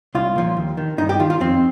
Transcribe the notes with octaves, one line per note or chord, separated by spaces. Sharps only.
C2 F4
A#2 F3
D#2
D#3
G2 D#4
G4
D#3 F4
F4
F2 C4